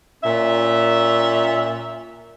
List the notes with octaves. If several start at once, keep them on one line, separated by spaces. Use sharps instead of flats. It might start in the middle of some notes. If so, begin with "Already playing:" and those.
A#2 C#4 E5